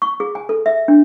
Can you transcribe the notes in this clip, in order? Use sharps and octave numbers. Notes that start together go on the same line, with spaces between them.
C#6
G#4
G#5
A4
E5
D4